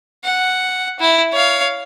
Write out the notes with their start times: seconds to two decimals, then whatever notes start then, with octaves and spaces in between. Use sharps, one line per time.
0.24 F#5
1.00 E4
1.32 C#5 F5